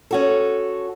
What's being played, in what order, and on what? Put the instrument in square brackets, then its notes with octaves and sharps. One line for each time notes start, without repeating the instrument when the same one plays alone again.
[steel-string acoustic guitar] C#4 F#4 A4